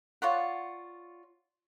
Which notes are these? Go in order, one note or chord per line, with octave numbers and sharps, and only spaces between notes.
F4 C#5 D5 F#5